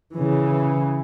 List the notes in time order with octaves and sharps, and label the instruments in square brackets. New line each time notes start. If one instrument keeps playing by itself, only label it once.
[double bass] C#3 E3